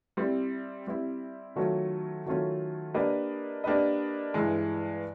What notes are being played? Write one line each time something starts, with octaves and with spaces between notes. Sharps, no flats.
G3 C4 E4
G3 C4 E4
D#3 F#3 A3 C#4 F4
D#3 F#3 A3 C#4 F4
A#3 D4 G4 B4 D#5
A#3 D4 G4 B4 D#5
G2 E3 G#3